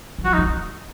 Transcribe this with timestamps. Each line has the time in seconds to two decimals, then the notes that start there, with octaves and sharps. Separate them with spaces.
0.19 F#3
0.24 F3 F#4
0.33 D#4
0.38 F#3